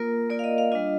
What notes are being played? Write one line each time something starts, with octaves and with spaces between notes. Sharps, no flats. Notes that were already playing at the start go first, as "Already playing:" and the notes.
Already playing: A#3 F4 A#4
A#3 F4 D5
F5
D#5
F5
G3 D4 F4 D#5